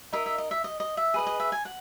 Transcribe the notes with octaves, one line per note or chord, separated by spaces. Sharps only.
D#4 A#4 D#5 E5
E5
D#5
E5
D#5
D#5
E5
G#4 B4 D#5
D#5
E5
G#5
F#5